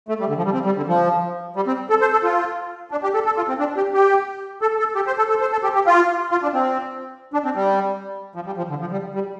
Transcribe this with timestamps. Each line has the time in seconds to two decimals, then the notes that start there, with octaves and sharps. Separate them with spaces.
0.09 A3
0.20 G3
0.29 D3
0.37 F3
0.45 G3
0.54 C4
0.65 G3
0.77 D3
0.88 F3
1.56 G3
1.67 C4
1.90 A4
2.01 C5
2.12 A4
2.24 F4
2.91 D4
3.03 G4
3.14 A4
3.26 A4
3.37 F4
3.48 C4
3.59 D4
3.77 G4
3.94 G4
4.62 A4
4.79 A4
4.96 G4
5.07 C5
5.18 A4
5.29 A4
5.41 C5
5.52 A4
5.63 G4
5.75 G4
5.87 F4
6.31 F4
6.42 D4
6.54 C4
7.33 D4
7.45 C4
7.56 G3
8.36 F3
8.46 G3
8.57 F3
8.70 D3
8.81 F3
8.92 G3
9.15 G3